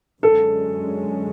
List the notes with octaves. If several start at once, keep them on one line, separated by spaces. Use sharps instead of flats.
F#2 D3 G#3 C#4 A4